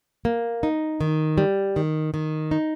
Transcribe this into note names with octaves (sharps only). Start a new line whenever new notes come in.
A#3
D#4
D#3
G3
D#3
D#3
D#4